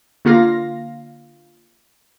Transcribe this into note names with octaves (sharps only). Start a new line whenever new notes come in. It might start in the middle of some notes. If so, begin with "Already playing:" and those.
D3 A#3 F4 F5 A#6